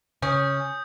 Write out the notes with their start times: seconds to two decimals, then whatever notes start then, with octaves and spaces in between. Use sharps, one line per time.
0.22 C#3 C#4 D#6 G6